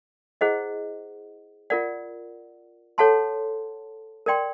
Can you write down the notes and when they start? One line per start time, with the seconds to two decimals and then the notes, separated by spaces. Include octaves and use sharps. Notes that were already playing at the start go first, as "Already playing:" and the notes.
0.41 E4 G#4 C5 D#5 F#5
1.70 F4 A#4 D5 F#5
2.98 A4 C#5 F#5 A5 C6
4.26 A#4 D5 G5 C6